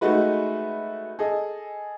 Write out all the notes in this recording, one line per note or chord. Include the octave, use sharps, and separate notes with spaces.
G#3 A3 D#4 F#4 B4
G#4 A4 D#5